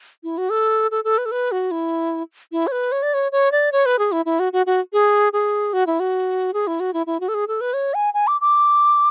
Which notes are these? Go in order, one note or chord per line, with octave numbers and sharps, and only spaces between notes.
E4
F#4
A4
A4
A4
B4
A4
B4
F#4
E4
E4
C#5
B4
C#5
D5
C#5
C#5
D5
C#5
B4
G#4
E4
E4
F#4
F#4
F#4
G#4
G#4
F#4
E4
F#4
G#4
E4
F#4
E4
E4
F#4
A4
G#4
A4
B4
C#5
G#5
G#5
D6
D6